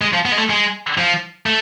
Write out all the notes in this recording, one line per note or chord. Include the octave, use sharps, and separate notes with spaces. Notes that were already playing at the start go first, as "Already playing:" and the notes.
G#3
F3
B3
G#3
A3
G#3
F3
A3